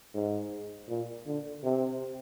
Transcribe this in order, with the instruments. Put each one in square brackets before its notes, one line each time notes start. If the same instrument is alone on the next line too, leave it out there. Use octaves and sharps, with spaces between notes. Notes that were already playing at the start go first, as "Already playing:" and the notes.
[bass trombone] G#2
A#2
D3
C3